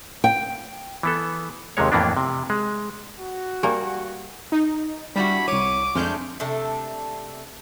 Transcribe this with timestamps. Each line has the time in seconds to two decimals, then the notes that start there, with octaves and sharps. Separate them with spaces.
0.24 G5
1.03 E3 B3 A4
1.77 D#2 C3 D#3 G#3 C#5
1.92 F2 A2 E3 A#3 B3 D4
2.17 C3
2.50 G#3
3.20 F#4
3.63 G3 A#3 G4 G#5
4.52 D#4
5.16 G3 D4 E4 F#4 B5
5.48 C2 C#5 D6 D#7
5.95 F2 G#3 A3 D4 F6 G6
6.40 C3 A3 D4 A4